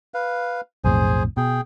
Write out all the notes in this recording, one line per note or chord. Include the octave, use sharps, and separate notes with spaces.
B4 F5
B1 F2 A2 G#4 C5 G#5
B2 G#4 G5